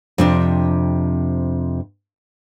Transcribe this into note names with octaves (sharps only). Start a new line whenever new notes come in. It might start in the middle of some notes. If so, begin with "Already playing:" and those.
F2 C3 D4